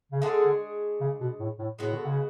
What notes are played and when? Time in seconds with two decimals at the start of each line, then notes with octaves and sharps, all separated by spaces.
0.12 C#3
0.22 D3 G#3 D4 G#4 C#5
1.01 C#3
1.21 B2
1.40 A2
1.59 A2
1.79 A2 G#3 B3 F#4
1.93 D3
2.05 C#3